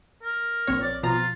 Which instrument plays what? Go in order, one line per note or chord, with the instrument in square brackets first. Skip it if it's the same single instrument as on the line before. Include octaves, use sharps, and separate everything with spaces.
[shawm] A#4
[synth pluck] A#1 C4 C#5
[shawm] D5
[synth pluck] B2 F3 A#5 [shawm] F4